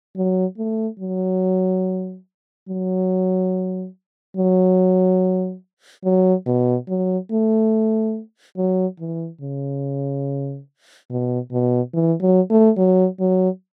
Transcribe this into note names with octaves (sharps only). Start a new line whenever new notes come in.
F#3
A3
F#3
F#3
F#3
F#3
B2
F#3
A3
F#3
E3
C#3
B2
B2
E3
F#3
A3
F#3
F#3